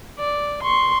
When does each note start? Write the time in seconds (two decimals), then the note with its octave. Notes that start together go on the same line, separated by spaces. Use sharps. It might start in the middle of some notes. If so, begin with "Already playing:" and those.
0.19 D5
0.63 C6 C#6